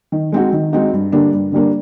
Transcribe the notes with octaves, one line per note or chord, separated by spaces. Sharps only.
D#3
G#3 C4 D#4 F#4
D#3
G#3 C4 D#4 F#4
G2
D3 G3 A#3 D4
G2
D3 G3 A#3 D4